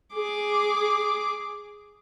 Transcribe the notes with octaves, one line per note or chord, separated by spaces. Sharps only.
G#4 D6